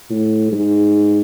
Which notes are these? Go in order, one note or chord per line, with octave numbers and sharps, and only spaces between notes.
A2
G#2